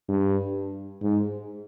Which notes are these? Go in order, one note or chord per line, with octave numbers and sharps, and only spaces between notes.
G2
G#2